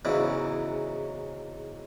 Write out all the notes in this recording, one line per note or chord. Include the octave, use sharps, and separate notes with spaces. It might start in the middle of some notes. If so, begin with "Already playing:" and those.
E2 G#2 C#3 F#3 E4